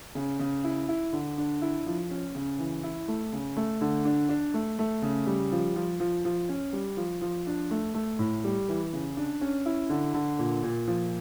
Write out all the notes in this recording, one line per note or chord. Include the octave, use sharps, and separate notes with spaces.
C#3
C#3
E4
E4
D3
D4
E4
F3
C#4
C#3
E3
E4
A3
C#3
A3
D3
D4
D4
A3
A3
C#3
G3
F3
F3
F3
F3
C#4
G3
F3
F3
D4
A3
A3
A2
G3
E3
C#3
D4
C#4
E4
D3
D3
A#2
A#2
F3